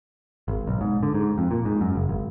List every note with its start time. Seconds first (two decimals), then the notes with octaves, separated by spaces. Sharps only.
0.48 G#1
0.67 B1
0.81 G#2
1.03 D3
1.14 G#2
1.38 F2
1.51 A#2
1.65 G#2
1.81 F#2
1.96 F#1
2.09 G#1